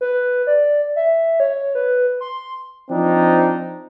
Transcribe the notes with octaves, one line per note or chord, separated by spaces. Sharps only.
B4
D5
E5
C#5
B4
C6
F3 C4 D4 D#4